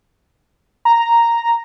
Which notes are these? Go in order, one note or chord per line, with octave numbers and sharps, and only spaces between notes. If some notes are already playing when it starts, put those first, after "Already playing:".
A#5